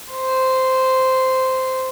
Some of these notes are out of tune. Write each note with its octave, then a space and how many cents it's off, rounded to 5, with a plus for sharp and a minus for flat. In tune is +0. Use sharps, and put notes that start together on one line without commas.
C5 -10